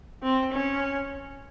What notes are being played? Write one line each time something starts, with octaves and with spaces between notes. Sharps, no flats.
C4
C#4